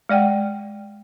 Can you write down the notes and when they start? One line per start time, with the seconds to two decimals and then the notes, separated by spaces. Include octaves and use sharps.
0.09 G#3 D5 F#5 G5